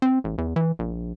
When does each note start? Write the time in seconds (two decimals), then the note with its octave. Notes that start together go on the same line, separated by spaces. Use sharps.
0.02 C4
0.24 A1
0.38 E2
0.56 E3
0.79 A#1